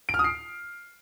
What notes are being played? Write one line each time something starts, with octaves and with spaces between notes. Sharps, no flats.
D7
F6
D#6
C7